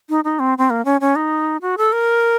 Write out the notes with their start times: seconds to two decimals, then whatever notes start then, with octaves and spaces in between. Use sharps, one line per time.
0.09 D#4
0.24 D#4
0.39 C4
0.58 C4
0.70 A#3
0.85 C#4
1.01 C#4
1.16 D#4
1.62 F#4
1.78 A4
1.92 A#4